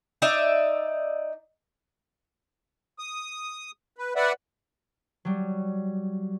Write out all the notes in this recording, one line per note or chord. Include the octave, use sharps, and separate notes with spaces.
D#4 D5 E5
D#6
B4
B4 D5 E5 F#5
F#3 G3